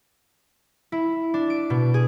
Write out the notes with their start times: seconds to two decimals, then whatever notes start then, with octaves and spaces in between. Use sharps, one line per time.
0.92 E4
1.34 D4
1.50 D7
1.70 B2
1.94 G#4